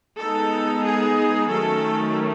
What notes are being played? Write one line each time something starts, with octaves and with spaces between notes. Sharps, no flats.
G#3 B3 D#4 A4
G#4
D#3 F#3 A3 C#4 A4